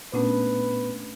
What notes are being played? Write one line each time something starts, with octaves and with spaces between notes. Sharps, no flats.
A#2 A3 B3 C#4 D4 B4